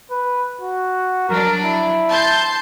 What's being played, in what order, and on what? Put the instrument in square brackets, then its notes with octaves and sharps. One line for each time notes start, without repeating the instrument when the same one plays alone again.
[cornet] B4
F#4
[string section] F#3 D4 [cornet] A#4
[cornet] E4
[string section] A5 C6 G6